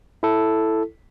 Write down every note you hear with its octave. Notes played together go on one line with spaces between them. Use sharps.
E4 A4